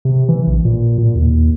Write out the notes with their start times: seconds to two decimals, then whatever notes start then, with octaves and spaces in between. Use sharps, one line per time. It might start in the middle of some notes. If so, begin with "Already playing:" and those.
0.05 C3
0.29 E3
0.47 A#1
0.65 A#2
0.98 A#2
1.15 D#2